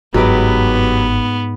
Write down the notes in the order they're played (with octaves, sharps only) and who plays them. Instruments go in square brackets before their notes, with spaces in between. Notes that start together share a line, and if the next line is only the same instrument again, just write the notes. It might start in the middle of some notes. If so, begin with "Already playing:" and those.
[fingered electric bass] G1 [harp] G#2 D6 [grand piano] F#3 G4 B4 [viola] B3